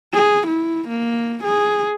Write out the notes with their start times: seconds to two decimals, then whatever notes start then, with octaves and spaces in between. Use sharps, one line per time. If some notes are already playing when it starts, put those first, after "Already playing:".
0.14 G#4
0.47 E4
0.88 A#3
1.44 G#4